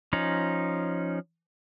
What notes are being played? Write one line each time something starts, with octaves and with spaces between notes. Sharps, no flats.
F3 C#4 D#4